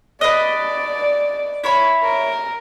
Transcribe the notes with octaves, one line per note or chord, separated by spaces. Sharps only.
B4 D5 D#5
E4 C#5 B5
A#4